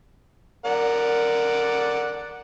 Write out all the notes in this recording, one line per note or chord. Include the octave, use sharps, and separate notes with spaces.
A#4 D5 F#5